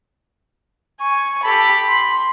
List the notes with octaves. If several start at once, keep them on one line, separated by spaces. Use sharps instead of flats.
G#5 C#6
G4 A4 B5
C6